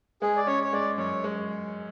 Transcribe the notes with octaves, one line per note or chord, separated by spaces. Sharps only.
G#3 G#4
D5
C#4 C#5
C#5
G#3 D5
F#2 C#5
G#3